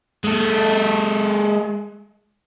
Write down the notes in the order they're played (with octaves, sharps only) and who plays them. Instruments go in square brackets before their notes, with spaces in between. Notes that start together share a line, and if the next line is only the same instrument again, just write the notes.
[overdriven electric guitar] G#3 A4